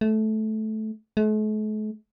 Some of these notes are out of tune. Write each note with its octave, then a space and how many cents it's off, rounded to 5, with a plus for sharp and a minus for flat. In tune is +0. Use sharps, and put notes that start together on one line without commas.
A3 -15
A3 -45